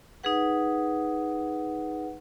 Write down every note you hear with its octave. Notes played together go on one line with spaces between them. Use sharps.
D#4 G#4 B4 F#5